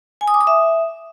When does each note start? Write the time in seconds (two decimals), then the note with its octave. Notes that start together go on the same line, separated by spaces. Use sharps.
0.21 G#5
0.28 D#6
0.34 D6
0.41 D#6
0.47 E5